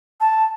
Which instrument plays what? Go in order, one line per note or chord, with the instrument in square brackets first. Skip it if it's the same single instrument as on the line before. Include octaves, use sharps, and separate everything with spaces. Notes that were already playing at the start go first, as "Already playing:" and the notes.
[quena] A5